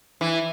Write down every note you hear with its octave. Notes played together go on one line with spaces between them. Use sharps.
E3